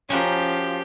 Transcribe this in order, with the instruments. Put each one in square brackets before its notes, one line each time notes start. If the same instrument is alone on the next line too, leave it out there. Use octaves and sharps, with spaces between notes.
[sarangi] F3 [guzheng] C#4 F#4 A#4 [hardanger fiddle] G4